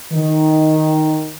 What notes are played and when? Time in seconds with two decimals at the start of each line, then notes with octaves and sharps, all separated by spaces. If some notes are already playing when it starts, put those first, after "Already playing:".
0.12 D#3